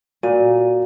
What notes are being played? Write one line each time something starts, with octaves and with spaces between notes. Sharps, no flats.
A#2 F#4